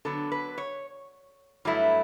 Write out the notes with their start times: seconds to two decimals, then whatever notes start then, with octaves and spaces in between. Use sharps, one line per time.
0.05 D3 F#3 B3 A4
0.32 B4
0.58 C#5
1.65 G2 F#3 A3 E4